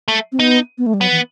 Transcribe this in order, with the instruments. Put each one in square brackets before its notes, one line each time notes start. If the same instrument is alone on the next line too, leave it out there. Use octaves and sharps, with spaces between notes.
[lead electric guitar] A3
[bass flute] C4
[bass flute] B3 [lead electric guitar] D#4
[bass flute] B3
A3
G3
[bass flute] F#3 [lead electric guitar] B3
[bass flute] E3